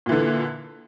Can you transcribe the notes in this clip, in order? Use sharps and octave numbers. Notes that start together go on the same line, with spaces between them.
A#2 D3 E3